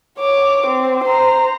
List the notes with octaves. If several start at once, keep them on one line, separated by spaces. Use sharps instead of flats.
C#5 D6
C4
C5 A#5